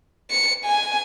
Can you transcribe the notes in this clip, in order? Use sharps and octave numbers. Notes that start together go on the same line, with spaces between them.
C#7
G#5